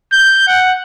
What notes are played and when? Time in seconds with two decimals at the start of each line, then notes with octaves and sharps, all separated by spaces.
0.13 G6
0.48 F#5